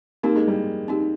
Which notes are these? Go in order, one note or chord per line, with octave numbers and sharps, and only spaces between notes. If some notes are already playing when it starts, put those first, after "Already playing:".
A#3 C4 D#4 G4
G#3
G3 A#3
C4 D#4 G4